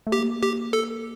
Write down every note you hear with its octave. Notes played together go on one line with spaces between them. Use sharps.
A3
A#3 G4
G4
A4